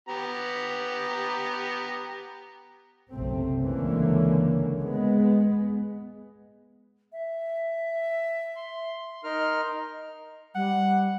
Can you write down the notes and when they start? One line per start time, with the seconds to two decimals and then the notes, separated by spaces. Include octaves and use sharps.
0.09 B3 G4 A#5
3.11 F#1 B1 C3 A3 C4
3.63 C#2 D3 E3 A#3 C#4
4.80 G#3 B3
7.12 E5
8.56 C6
9.24 D#4 A#4 C6 F6
10.55 G3 F#5